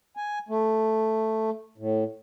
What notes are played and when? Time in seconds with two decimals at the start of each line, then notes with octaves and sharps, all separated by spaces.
0.17 G#5
0.49 A3
1.78 A2